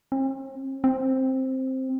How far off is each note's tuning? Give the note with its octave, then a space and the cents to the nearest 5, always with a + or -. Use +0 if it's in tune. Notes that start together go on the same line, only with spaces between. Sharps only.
C4 +45
C4 +5